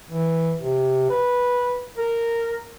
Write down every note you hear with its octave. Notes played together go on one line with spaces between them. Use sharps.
E3
C3
B4
A#4